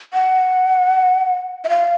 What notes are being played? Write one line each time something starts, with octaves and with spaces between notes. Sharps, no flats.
F#5
E5
F5